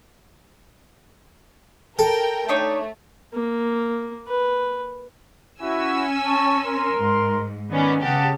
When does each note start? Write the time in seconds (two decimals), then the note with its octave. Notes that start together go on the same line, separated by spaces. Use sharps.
1.99 A4 A#4 G5
2.48 A3 D4 D#4 C#5
3.34 A#3
4.28 B4
5.61 C#4 E4 F#4 G#5 E6
6.25 A5 C#6
6.64 A#4 C6
6.97 G#2
7.70 D#3 B3 C#4 D5 B5
8.02 C#3 G4 G#4 F#5 A5